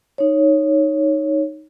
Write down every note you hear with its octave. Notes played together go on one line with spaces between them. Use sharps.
D#4 C#5